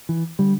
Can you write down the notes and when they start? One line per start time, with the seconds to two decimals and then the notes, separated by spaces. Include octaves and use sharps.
0.09 E3
0.39 D3 G3